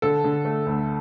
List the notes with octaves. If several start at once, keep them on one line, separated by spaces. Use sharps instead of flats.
D3 A4
D3
A3
D2